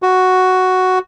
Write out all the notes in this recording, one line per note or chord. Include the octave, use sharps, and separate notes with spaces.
F#4